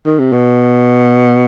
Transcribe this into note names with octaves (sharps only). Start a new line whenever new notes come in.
D#3
C3
B2